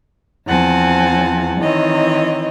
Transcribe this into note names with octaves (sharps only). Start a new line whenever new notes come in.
E2 F3 C4 F#5 G#5 A5
D#3 E3 C4 C#5 D#5